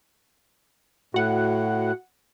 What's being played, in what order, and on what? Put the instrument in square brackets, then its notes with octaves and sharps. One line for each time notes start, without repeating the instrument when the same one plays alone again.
[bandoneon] A2 [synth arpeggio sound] F#4 F#5